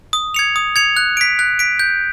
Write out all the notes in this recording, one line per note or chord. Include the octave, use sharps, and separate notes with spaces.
D#6
G#6 C#7 F7
D#6
G#6 C#7 F7
F#6
B6 D7
F#6
B6 D7
G6